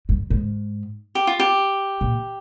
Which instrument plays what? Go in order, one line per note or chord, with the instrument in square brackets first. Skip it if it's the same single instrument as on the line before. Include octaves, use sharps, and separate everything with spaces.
[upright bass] G2
G#2
[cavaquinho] G4
F4
G4
[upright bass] A#2